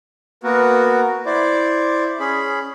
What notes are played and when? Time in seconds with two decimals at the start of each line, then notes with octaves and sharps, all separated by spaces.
0.44 A#3 B3 F#4 A#4
1.26 E4 C5 D5
2.20 C#4 G#4 B5